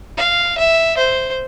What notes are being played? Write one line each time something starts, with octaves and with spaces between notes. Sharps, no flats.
F5
E5
C5